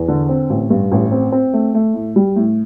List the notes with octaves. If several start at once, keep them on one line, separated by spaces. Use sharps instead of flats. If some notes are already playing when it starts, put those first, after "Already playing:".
Already playing: E2
D3
C4
A1
G2
A1
C4
C4
A3
A3
A2
G3
A2